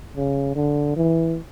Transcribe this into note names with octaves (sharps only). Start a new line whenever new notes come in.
C#3
D3
E3